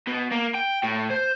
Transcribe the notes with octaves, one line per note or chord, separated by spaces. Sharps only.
B2
A#3
G5
A2
C5